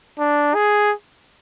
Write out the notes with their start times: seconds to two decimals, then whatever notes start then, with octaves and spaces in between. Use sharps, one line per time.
0.19 D4
0.55 G#4